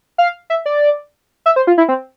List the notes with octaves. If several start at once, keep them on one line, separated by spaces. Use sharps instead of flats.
F5
E5
D5
E5
C5
F4
E4
C4